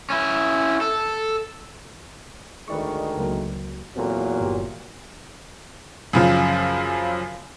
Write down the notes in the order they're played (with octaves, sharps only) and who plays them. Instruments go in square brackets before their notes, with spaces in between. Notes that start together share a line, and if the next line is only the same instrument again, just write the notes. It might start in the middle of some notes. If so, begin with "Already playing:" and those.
[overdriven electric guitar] C#4 E4
A4
[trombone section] D2 D#3 G#3 [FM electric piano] B4 D5 C#6
[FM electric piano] C#2 F#3 A#3
[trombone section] E2 A#2 F#3 [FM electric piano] C4 A4 A#4
[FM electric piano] G1 G4
[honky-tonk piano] F#2 C#3 F3 F4